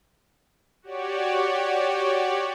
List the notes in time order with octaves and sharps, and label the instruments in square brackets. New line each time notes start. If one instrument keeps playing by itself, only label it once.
[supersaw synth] F#4 G4 C#5 D5